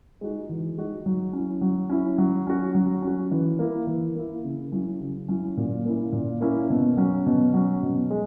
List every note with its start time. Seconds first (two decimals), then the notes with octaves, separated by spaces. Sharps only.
0.21 G#3 D#4 F#4
0.49 E3
0.78 G#3 D#4 F#4
1.06 F#3
1.33 C#4 E4
1.61 F#3
1.90 C#4 E4
2.18 F#3
2.47 C#4 F#4
2.75 F#3
3.02 C#4 F#4
3.31 E3
3.59 A#3 E4
3.87 E3
4.15 A#3 E4
4.44 C#3
4.72 F#3 C#4 E4
5.00 C#3
5.29 F#3 C#4 E4
5.57 A#2
5.85 A#3 C#4 E4
6.12 A#2
6.41 A#3 C#4 E4
6.70 B2
6.97 F#3 C#4
7.26 B2
7.54 F#3 C#4
7.83 B2
8.10 G#3